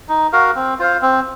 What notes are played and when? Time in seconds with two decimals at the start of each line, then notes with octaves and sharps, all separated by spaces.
0.09 D#4
0.33 F#4 A#4 F5
0.55 C4
0.79 F4 C5 F5
1.02 C4